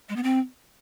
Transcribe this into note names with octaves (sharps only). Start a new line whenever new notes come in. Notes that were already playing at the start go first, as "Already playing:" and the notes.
G#3
B3
C4